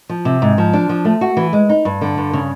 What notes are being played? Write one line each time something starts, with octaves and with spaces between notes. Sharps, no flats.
F3
C3
G#2
F3
D4
F3
A3
F#4
E3
G#3
D#4
G2
D3
G2
C#3